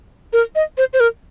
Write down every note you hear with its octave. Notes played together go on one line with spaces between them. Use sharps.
A#4
D#5
C5
C5
A#4